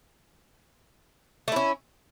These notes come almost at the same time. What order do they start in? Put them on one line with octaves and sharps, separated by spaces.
A3 E4 C#4